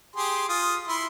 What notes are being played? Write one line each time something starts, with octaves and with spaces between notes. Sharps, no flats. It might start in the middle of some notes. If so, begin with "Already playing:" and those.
G4 G#4 C6
F4 D#6
E4 C6